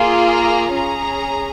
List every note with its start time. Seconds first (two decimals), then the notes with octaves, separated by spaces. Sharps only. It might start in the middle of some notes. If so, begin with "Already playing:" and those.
Already playing: A#3 F4 G#4
0.28 A#5
0.73 C#4 G#4 A#5